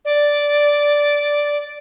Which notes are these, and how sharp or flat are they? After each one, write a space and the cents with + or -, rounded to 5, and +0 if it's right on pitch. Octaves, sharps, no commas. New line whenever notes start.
D5 -5